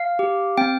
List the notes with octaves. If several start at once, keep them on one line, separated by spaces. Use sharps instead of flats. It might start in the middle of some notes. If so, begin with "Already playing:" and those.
Already playing: F5
G4
C4 G5